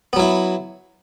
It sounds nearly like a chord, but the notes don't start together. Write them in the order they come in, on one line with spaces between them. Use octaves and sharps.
B3 F#3 E4